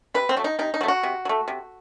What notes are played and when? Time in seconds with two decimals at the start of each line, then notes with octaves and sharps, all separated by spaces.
0.14 C3 B4
0.29 C4
0.37 F#3 A3
0.44 D#4
0.59 C3 D#4
0.74 D#4
0.81 F#3 A3
0.88 F#4
1.03 C3
1.25 F#3
1.29 A3
1.48 C3